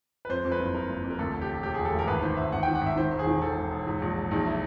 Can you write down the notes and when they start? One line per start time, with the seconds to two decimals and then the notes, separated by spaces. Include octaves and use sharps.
0.25 B4
0.29 F2 C5
0.44 F2
0.51 B4
0.59 F#1
0.74 F#1 A#4
0.89 F#1
1.04 F2
1.11 A#4
1.19 D2 A4
1.34 E1
1.41 G4
1.49 E1
1.63 E1 G4
1.74 E1 G#4
1.85 A4
1.93 D2
1.99 A#4
2.07 G#1 B4
2.22 D#3 C5
2.37 G#1 E5
2.52 G#1 F#5
2.63 D#3 G5
2.75 F#5
2.82 G#1 E5
2.96 D#3 C5
3.12 E1
3.19 G#4
3.27 D#3
3.42 D#3 A4
3.57 E1
3.71 E1
3.87 G#2
4.02 A#1
4.15 G#2
4.31 A#1 D#4
4.46 E4